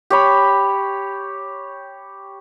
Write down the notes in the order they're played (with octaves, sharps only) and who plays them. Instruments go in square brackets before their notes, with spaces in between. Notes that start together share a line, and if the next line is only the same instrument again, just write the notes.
[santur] G4 C#5 B5